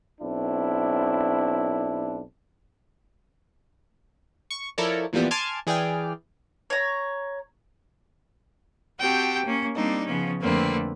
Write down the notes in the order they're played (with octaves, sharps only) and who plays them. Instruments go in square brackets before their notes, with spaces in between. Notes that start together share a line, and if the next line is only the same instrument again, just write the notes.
[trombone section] B1 C4 D4 E4
[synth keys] C#6
F3 E4 A4 A#4 C#5 D5
A#2 E3 F3 G3 B3
G#5 A5 C6 D6 F6 G#6
E3 G#4 D5 G5 F6
[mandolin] C#5 A#5
[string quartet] C4 F#4 G4 G5 A5
A#3 C#4
G3 A#3 C4 D4 D#4
C#3 F3 B3 C#4
F2 D3 A3 A#3 C4 B4